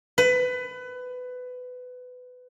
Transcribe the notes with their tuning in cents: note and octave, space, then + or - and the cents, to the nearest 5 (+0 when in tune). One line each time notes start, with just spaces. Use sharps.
B4 +20